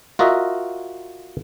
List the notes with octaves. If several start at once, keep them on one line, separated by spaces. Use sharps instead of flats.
F4 F#4 A#4 D#5 E5